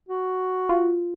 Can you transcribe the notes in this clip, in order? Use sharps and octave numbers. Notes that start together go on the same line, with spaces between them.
F#4
F4